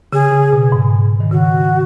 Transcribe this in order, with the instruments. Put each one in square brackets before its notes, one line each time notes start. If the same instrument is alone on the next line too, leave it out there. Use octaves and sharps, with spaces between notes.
[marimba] C#3 [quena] G#4
[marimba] C#3
B2
G#2
D#3
[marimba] C#3 [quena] F#4